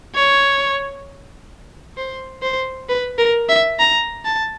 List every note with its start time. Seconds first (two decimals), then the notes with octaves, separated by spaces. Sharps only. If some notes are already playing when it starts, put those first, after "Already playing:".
0.15 C#5
1.97 C5
2.42 C5
2.89 B4
3.19 A#4
3.49 E5
3.79 A#5
4.25 A5